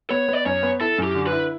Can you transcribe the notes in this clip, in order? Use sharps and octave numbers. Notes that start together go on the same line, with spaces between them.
B3 C#5
B3 D5
F#2 C#5
B3
E4 A4
F#2
G4
D3
B4
E4